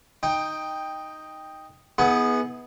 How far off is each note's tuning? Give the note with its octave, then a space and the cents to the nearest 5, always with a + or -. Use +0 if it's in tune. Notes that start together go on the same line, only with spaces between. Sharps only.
D#4 +0 G5 +10
B3 -5 E4 -45 G#4 +10